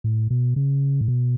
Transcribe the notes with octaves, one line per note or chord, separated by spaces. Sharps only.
A2
B2
C#3
A2
B2